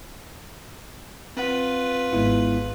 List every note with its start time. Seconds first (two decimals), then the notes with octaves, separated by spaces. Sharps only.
1.37 C4 F4 B4 F#5
2.13 G#1 G#3 B3 E4